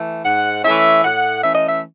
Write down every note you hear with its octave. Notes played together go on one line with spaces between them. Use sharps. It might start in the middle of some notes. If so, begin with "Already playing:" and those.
Already playing: E3 A3
G#2 F#5
E3 A3 C#4 E5
A2 F#5
E3 A3 C#4 E5
D#5
E5